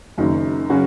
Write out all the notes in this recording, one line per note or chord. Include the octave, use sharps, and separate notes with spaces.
F#1 F#2 D#3
C#3 F#3 C#4 F#4